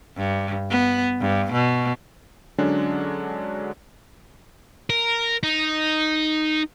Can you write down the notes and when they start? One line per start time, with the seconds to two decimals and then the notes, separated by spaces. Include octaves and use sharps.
0.17 G2
0.71 B3
1.21 G2
1.53 B2
2.58 D3 F#3 G#3 C#4 D4
4.90 A#4
5.43 D#4